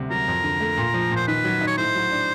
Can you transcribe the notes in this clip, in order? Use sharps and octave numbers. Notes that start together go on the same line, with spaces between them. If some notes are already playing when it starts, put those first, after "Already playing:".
Already playing: D2 C3 G3
F#3 A#4
F2
D3
A3
A#2
F3
A#2
C5
D#3 B4
F#3
D#4
C#5
A2 C5
F#3
D4